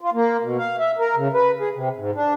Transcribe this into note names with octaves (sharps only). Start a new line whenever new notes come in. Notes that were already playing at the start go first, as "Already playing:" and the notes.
F4
A#3
B2
F5
E5
A#4
C#3
B4
G#4
C3
G#2
D4